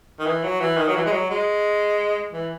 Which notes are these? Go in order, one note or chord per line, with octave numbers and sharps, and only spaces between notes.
D#3
E3
F#3
E3
D#3
F#3
E3
G#3
F#3
G#3
E3